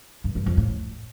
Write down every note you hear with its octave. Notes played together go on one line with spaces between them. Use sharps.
G2
G2
F2
A2